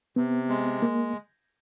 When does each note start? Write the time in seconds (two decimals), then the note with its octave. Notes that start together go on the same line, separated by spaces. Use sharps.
0.16 C3 B3
0.49 G#3
0.82 A#3